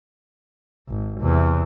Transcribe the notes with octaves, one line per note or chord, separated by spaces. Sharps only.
G#1
E2 C3